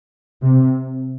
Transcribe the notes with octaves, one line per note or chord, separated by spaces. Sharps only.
C3